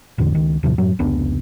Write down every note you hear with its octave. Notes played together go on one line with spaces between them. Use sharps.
A1 E2 D3
C#2 D#3
D#2 A2 C3 F3
F#2 A2 F#3
F1 C#2 B3 D4